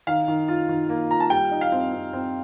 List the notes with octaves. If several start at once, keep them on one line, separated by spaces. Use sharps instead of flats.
D#3 F5
D#3
F4
D#3
A#3
F4 A#5
A5
G3 G5
D#4
F5
C4
C4
C4